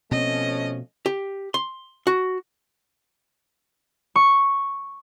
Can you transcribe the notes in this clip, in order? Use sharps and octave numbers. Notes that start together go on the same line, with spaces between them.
B2 F3 A3 C4 C#4 D#5
G4
C6
F#4
C#6